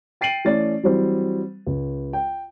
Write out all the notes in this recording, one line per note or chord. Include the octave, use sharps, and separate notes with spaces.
G5 A6 C7 D7 D#7 F#7
E3 A3 C#4 D5 A6
E3 F#3 G3 C4
C#2
G5